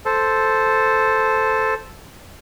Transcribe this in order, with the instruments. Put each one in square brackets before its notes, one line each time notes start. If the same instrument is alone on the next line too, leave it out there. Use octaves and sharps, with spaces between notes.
[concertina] A4 C5